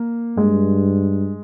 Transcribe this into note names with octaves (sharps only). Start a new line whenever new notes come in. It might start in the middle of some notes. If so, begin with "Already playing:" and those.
Already playing: A#3
G2 G#3